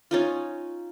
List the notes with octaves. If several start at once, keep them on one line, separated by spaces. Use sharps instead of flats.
C#4 D#4 F4